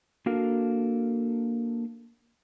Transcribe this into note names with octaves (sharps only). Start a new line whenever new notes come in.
A#3 D4 F#4 A4 A#4 F5